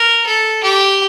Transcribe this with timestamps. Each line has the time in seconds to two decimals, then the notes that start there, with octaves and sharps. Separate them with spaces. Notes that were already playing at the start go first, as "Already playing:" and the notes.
Already playing: A#4
0.26 A4
0.63 G4